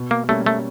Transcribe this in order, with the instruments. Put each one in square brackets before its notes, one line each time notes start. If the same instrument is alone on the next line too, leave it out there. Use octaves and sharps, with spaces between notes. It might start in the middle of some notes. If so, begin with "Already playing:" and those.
Already playing: [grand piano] B2
[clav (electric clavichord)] A#3
[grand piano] G3 A#3 C#4 [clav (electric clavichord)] A3
[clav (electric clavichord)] A3